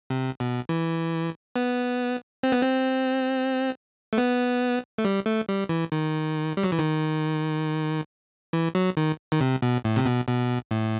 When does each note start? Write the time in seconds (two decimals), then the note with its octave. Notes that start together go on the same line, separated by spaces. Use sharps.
0.10 C3
0.40 B2
0.69 E3
1.56 B3
2.43 C4
2.52 B3
2.62 C4
4.13 A3
4.18 B3
4.98 A3
5.05 G3
5.26 A3
5.49 G3
5.69 E3
5.92 D#3
6.57 G3
6.63 F#3
6.72 E3
6.79 D#3
8.53 E3
8.75 F#3
8.97 D#3
9.32 D#3
9.41 C3
9.62 B2
9.84 A2
9.96 C3
10.06 B2
10.28 B2
10.71 A2